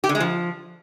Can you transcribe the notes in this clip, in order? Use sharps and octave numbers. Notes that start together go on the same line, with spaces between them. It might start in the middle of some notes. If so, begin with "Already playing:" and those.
G4
D3
G#3
F3